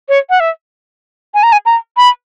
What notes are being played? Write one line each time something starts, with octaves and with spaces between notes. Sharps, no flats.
C#5
F#5
E5
G#5
A#5
G#5
A#5
B5